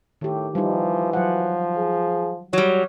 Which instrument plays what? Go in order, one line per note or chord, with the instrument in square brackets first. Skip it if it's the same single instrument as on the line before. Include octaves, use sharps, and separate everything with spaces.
[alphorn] A2 [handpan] D#3 G4
[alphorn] E3 [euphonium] F3 [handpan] G3 D#4
[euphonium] F3 [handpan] F#3 F#5
[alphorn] G#4
[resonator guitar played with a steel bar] F#3 G3 [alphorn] C#5